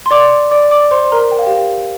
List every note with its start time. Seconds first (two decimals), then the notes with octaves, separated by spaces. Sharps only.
0.06 C6
0.11 D5 D6
0.51 D5 D6
0.71 D5 D6
0.91 C5 C6
1.12 A#4 A#5
1.32 G5
1.39 F5
1.46 G4 G5